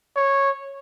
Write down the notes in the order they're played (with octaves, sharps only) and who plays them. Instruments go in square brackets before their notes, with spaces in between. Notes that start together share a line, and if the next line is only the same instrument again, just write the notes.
[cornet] C#5